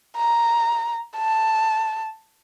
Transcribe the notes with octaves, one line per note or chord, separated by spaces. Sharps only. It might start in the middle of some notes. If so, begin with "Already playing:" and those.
A#5
A5